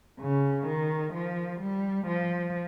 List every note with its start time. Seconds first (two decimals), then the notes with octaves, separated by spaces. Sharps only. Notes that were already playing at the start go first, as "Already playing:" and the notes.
0.21 C#3
0.67 D#3
1.14 F3
1.61 G3
2.07 F3